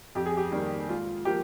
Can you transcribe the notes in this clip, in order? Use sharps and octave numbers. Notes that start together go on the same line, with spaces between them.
F2 G4
G#4
G4
D#3 G3 A#3
G#2 F4
F3 A#3 G4